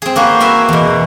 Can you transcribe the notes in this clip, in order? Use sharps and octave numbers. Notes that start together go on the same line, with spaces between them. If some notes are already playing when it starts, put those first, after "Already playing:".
C4 G#4
A#3 F#4 B4 C5
E4 A#4 E5 G#5
E2 B2